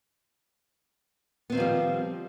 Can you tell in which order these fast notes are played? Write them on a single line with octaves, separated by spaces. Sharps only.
B3 C4 D#3 F3 G3